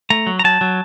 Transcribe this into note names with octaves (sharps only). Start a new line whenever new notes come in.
A3 A#5
F#3
A#5
F#3 A5
F#3